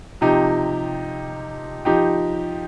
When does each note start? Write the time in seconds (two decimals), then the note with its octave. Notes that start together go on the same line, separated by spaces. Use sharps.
0.21 C3 F3 D#4 G4
1.85 F3 D#4 G4